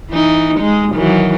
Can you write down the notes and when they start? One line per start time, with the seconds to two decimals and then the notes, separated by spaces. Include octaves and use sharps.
0.10 E3 D#4
0.60 G#3 D#4
0.93 D#3 E3 F#3